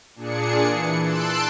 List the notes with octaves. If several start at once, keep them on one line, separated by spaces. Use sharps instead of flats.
A#2 D4 G#4 C#7
E3
A5 C6 E6 F#6 D7